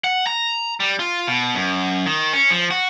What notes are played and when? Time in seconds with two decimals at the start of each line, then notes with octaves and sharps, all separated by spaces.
0.04 F#5
0.27 A#5
0.80 G3
0.99 F4
1.27 B2
1.55 F#2
2.06 D#3
2.33 C#4
2.50 F3
2.71 F#4